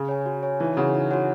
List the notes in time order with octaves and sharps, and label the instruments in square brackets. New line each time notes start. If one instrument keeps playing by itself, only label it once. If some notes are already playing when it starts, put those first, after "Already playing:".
Already playing: [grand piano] C#3
[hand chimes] C#5 G#5
F#4
C#5 G#5
[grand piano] E3 [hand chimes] D#4
[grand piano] C#3 [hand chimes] F#4 C#5 F#5
[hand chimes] D#4
F#4 C#5 F#5